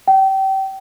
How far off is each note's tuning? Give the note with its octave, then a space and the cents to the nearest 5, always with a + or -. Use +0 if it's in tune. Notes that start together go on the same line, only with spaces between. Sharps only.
G5 -30